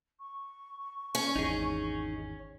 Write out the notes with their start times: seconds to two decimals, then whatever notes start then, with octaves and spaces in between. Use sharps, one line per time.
0.20 C#6
1.15 C#4
1.36 G#1 E2 D#4 G#4